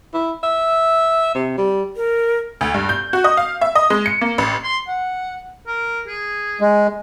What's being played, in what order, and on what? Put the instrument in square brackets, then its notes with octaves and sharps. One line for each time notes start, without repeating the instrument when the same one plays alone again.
[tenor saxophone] E4
E5
C3
G3
[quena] A#4
[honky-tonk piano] D2
G2
G6
F#4
D#5
F5
E5
D#5
G#3
C#7
A#3
A1
[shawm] C6
F#5
A#4
G#4
[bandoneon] G#3